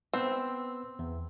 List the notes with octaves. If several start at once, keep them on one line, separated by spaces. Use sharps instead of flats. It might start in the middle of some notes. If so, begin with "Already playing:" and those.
B3 C4 B4 E6
E2